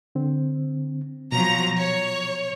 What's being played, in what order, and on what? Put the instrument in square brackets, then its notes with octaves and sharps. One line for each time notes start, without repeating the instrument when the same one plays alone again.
[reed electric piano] D3 C4
[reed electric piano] B2 [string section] F3 F#3 A#5
[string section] C#5